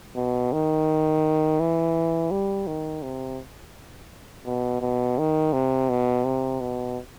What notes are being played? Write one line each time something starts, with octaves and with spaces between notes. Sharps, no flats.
B2
D#3
E3
G3
D#3
C3
B2
B2
D#3
C3
B2
C3
B2